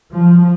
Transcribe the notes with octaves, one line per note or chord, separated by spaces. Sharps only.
F3